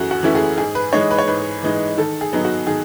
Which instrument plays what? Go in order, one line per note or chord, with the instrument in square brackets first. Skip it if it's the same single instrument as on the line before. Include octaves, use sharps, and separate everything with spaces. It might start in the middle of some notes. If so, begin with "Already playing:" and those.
Already playing: [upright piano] F#2 E3 A3 F#4 G#4
F#4
E3 A3 C#4 E4
G#4
G#2 G#4
B4
E3 G#3 D#4 C#5
B4
C#5
G#2 B4
E3 G#3 D#4
D#3 A4
G#4
F#3 B3 D#4
F#4
D#3 G#4